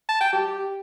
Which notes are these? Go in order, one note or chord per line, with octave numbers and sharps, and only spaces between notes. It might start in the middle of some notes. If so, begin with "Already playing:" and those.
A5
G5
G4